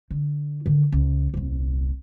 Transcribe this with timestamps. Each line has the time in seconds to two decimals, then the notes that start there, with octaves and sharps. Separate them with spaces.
0.11 D3
0.66 D3 D#3
0.92 C#2
1.34 D#1 C2